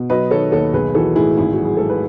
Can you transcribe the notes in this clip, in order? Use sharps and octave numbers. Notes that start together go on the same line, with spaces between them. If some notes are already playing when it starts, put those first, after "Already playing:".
Already playing: B2
F#3 B4 D#5
D#3 A4 C#5
D#2 A4 C#5
B1 G#4 B4
E3 F#4 A4
A2 E4 G#4
G#1 E4 G#4
F#4
F#3
G#4
G#2 A4
B4